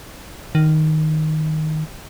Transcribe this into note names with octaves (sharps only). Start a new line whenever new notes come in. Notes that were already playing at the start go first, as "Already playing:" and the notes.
D#3